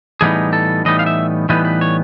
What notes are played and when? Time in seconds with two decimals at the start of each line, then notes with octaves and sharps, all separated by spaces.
0.21 A2 E3 G3 B3 D#4 G#4
0.53 A4
0.85 A2 E3 G3 B3 D#4 D#5
0.99 F5
1.06 E5
1.49 A2 E3 G3 B3 D#4 B4
1.65 B4
1.81 C#5